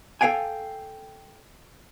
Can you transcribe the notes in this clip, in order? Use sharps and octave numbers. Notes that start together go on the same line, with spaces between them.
A4 B4 F5 G5 G#5